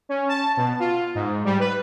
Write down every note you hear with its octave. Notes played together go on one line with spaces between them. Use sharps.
C#4
A5
B2
F4
G#2
G3
B4